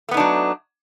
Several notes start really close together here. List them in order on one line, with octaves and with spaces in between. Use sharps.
A3 B3 D#4 D4 F#3